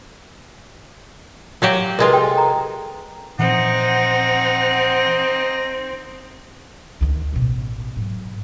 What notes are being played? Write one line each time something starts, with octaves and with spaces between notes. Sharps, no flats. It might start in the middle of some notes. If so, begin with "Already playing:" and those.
F#3 F#4 G4 F5
C3 G#3 F4 A#4 B4
A4 G5
A4 A#5
A#2 E3 F3 C4 D#4 F#5
D2 D#3
A1 B2
G#2 F#3